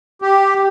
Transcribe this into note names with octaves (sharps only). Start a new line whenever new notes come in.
G4